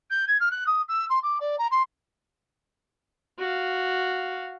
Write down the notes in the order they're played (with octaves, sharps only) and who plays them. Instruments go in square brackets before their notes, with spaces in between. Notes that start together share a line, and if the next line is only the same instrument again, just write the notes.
[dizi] G6
G#6
F6
F#6
D#6
E6
C6
D6
D5
A#5
C6
[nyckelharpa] F#4 F5